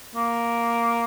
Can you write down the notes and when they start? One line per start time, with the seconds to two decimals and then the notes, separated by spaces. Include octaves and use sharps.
0.15 A#3